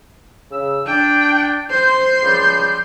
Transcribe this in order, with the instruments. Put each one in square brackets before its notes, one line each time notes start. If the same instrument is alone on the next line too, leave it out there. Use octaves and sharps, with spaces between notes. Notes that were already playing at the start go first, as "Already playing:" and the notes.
[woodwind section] C#3 E6
[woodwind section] D4 [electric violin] G5
[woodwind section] C5 [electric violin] C6 G6
[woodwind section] C#2 F3 G3